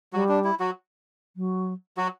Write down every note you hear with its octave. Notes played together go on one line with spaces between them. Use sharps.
F#3 G3 F#4
D4
E4
F#3 F#4
F#3
F#3 F#4